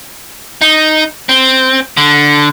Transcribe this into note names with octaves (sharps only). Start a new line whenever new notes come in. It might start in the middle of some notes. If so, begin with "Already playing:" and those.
D#4
C4
D3